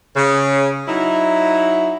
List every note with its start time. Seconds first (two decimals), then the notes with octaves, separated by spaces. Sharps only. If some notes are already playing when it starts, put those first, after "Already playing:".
0.15 C#3
0.88 F#3 D#4 E4